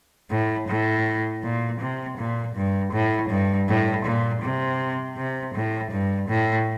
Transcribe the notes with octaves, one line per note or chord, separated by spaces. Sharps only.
A2
A2
A#2
C3
A#2
G2
A2
G2
A2
A#2
C3
C3
A2
G2
A2